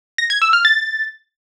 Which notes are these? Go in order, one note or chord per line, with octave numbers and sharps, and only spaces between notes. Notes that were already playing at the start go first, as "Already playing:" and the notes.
A#6
G#6
E6
F6
A6